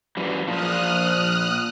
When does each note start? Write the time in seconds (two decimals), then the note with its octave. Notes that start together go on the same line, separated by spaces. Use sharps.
0.17 F#2 E3 G3
0.47 A#2 F3 D#6 F6 F#6